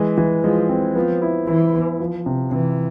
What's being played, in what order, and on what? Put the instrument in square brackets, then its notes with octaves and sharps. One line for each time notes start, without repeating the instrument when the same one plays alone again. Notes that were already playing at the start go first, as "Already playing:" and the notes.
Already playing: [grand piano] E3 G#3
E3
[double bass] F3 [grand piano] G#3
[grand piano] C4
[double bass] F3 [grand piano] B3
[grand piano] E4
[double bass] E3 [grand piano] E4
[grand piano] B3
F3
C3
[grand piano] C3 [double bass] E3